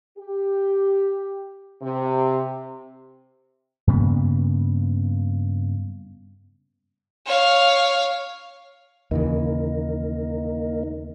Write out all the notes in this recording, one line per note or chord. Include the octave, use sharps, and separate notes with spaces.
G4
C3
G2 C#3 A#3 B3
C#5 F5
D#2 C#3 E3 A#3 D#4